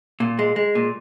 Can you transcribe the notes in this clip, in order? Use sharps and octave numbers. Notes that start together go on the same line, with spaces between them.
A#2
G#3
G#3
A#2